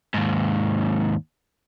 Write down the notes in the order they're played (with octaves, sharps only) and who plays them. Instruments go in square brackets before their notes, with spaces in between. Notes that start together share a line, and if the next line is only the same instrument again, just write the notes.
[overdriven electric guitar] D#2 G#2